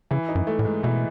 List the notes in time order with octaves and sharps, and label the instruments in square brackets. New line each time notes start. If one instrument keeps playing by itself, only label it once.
[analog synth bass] C#3 [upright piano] E3
[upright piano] D#4
[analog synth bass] F#2
[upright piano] A3
[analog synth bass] A2
[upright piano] G#2
[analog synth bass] B2 [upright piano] E3